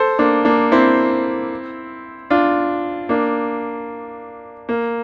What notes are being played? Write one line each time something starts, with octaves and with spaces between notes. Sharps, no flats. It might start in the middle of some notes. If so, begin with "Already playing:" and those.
Already playing: A4 C5
A#3 D4
A#3 D4
C4 E4
D4 F4
A#3 D4
A#3